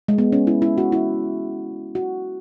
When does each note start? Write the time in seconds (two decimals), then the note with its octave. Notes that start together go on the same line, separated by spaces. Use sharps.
0.08 G#3
0.18 B3
0.32 C#4
0.47 E4
0.62 E4
0.78 F#4
0.92 E4
1.95 F#4